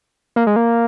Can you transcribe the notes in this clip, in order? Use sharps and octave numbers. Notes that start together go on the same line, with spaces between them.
A#3
G#3
A#3